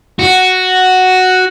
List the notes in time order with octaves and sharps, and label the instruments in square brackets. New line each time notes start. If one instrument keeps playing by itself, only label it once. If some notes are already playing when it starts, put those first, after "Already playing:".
[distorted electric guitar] F#4